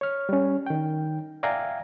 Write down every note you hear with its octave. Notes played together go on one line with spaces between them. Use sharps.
C#5 F6
G3 C#4
D#3 G5
D5 E5 F5 G5 G#5 A#5